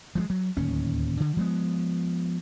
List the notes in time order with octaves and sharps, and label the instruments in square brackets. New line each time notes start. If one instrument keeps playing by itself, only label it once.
[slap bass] F3 F#3 G#3
F#3
D1 D#2 C#4
D3
F3 G#3 B3